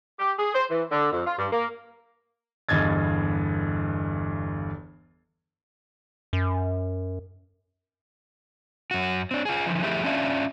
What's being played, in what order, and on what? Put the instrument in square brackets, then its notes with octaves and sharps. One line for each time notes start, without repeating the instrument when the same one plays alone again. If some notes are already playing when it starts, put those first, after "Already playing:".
[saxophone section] G4
G#4
C5
E3
D3
F2
F4
G2
A#3
[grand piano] G1 E2 G2 D#5 G#6 A6
[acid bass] F#2
[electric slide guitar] F#2 F#4
C4 D4
F4 G#4
D3 E3 F3
F3 A3 E4 G4 G#4
C#4 D4 F4 E5